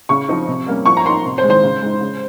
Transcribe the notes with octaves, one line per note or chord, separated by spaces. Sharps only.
C#3 C#6
F3 C4 D#4
C3
G3 A#3 C#4
F3 C#6
A#5
A#3 D#4 C6
C3
C5
G#3
D#3 C5
C#3
G#3 D#4
C#3